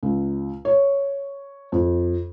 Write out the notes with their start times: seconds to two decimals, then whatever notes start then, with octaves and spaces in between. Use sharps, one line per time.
0.03 C#2
0.65 C#5
1.72 F2